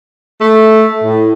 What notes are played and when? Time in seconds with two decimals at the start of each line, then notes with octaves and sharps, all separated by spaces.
0.41 A3
1.03 A2